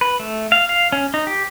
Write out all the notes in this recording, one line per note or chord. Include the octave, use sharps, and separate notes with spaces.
B4
A3
F5
F5
C#4
D#4
G4